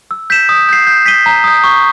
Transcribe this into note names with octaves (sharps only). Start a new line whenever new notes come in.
E6
G6 B6 E7
D#6
G6 C7
G6
B6 D#7 G7
A#5
D#6 G6
C#6